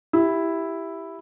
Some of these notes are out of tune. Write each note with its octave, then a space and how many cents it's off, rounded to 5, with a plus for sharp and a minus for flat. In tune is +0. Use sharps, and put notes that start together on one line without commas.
E4 +0 G4 +0